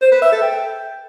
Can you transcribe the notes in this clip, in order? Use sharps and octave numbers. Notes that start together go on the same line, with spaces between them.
C5
B4
E5
A4
G5